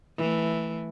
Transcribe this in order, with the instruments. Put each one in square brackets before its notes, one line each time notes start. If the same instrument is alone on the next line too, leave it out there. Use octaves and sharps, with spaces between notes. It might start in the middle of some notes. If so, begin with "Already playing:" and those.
[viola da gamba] E3 A3